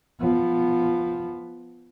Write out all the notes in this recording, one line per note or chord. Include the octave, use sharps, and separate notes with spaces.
F3 B3